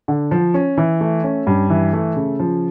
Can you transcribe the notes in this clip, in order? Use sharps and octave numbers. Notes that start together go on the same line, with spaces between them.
D3
F3
C#4
E3
A3
C#4
G2
E3
A3
C#3
F3